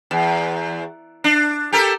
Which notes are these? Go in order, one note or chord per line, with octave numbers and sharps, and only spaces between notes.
E2
D4
G4 A4 A#4